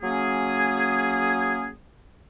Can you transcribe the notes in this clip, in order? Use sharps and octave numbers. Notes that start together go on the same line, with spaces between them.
F#3 A#3 C#4 G#4